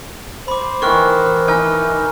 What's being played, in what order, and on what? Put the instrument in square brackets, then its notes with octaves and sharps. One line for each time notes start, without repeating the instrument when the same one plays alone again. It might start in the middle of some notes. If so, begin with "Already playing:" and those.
[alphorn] C5 [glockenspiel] B5 D6
[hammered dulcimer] D#3 E3 [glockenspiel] C#6 F6 F#6
[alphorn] E3 [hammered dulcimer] D#4 [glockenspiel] G#5 F6